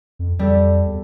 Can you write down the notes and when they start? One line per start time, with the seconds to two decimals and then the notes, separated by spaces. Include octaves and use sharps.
0.19 F2
0.39 F2 G3 A4
0.87 E2